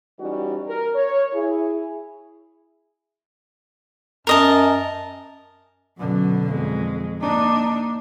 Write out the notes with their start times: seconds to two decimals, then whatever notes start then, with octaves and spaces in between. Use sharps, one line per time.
0.19 E3 G3 C#4 D#4 F#4
0.66 A#4
0.95 C#5
1.33 E4 G#4
4.27 F#2 A#4 D#5 A5
5.98 F#2 B2 D3
6.48 F2 G#3
7.21 A#3 D4 D#4